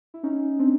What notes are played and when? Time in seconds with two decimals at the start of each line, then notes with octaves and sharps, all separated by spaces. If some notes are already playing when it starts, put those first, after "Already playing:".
0.14 E4
0.23 C#4 D#4
0.59 C4 D4